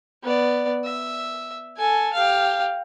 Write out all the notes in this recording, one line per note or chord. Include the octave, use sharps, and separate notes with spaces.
B3 D5
E5
A4 G#5
G4 F5